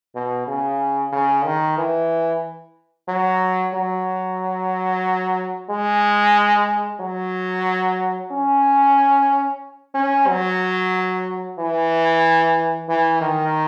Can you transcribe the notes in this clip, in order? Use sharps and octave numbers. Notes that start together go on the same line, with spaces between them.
B2
C#3
C#3
D#3
E3
F#3
F#3
G#3
F#3
C#4
C#4
F#3
E3
E3
D#3